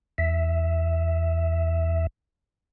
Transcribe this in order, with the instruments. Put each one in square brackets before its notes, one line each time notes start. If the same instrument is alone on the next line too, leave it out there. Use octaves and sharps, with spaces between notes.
[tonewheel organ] E2 E5